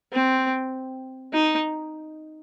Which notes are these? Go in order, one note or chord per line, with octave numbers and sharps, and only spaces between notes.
C4
D#4